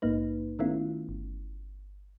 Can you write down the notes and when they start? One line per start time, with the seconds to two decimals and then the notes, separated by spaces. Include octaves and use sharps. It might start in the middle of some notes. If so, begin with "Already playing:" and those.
0.02 A#1 G#2 A#3 D#4 B4
0.59 D#3 A3 B3 C#4 E4 F4
1.09 G1